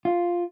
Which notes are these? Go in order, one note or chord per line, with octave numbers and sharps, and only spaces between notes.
F4